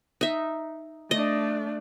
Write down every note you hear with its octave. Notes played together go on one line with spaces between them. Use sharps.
D#4 E5
A3 D4 D#5